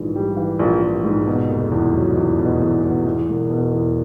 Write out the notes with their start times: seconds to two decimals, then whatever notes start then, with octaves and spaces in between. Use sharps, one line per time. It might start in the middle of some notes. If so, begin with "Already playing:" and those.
Already playing: A#1 G#2 E3
0.16 G3
0.37 E3
0.59 A#1
0.82 A#1
1.04 G#2
1.27 B2
1.49 F1
1.72 E2
1.94 F#3
2.17 E2
2.39 B2
2.61 E2
2.84 B2
3.06 E2
3.29 E1
3.50 B2
3.73 E2